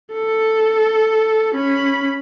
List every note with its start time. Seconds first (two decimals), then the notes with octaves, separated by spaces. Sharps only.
0.12 A4
1.55 C#4 B5